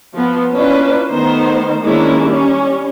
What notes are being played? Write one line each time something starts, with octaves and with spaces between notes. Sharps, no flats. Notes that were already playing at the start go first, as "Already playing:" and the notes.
F3 B3
A#3 C#4 D4 E4 F4 B4
D#3 A3 B3 D#4 C5
D#3 G#3 A#3 C#4 D4 E4
G3 C#4